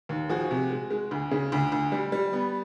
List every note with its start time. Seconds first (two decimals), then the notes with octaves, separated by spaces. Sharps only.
0.09 D#2
0.29 F3 F#4 G#4
0.51 C3
0.71 G#3
0.90 G#3
1.11 D2
1.31 C#3
1.52 D2
1.72 D2
1.92 G3
2.12 G3
2.33 B3